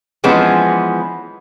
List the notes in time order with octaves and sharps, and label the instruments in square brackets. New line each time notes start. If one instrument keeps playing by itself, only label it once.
[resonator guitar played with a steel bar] E3 F3 G#3 B3 C#4